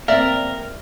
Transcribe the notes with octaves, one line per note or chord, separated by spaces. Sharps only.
A#3 C4 A#4 D5 E5